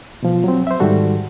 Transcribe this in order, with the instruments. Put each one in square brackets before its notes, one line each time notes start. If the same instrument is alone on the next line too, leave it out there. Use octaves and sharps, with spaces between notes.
[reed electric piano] B2 F3
F#3 C4
C5 E5
G#2 D#3 G3 F#4 A4